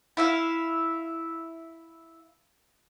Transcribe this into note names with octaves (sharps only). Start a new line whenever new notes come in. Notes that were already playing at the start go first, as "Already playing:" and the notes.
E4 E5 F5